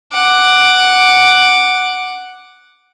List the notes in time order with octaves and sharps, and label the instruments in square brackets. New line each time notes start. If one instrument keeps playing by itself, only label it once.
[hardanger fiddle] F#5 D6